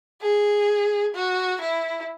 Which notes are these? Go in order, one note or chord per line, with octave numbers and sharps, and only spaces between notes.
G#4
F#4
E4